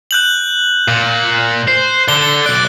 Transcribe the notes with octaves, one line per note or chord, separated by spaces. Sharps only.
F#6 G6 F#7
A#2
C5
D3 G7
B1 D5 F#6